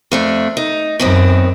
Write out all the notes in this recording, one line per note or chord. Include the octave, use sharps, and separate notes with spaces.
F2 A3 D4
D#4
F#2 D#3 B3 C4